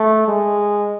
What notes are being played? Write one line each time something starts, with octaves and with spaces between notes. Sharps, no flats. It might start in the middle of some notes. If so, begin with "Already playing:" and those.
Already playing: A3
G#3